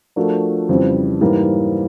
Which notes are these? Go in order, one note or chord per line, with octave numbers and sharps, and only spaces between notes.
F3 A3 D4 F#4 A#4
F2 C#3 E3 G3 C4
G#2 E3 G3 A#3